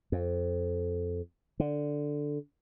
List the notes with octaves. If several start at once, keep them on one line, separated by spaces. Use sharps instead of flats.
F2
D3